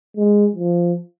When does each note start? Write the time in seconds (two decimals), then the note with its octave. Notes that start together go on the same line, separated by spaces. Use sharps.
0.17 G#3
0.55 F3